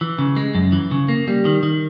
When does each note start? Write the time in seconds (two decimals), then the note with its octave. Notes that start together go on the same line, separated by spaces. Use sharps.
0.01 E3
0.19 C#3
0.37 G#3
0.55 F#2
0.72 E3
0.91 C#3
1.08 A#3
1.28 G3
1.45 D#3
1.63 D#3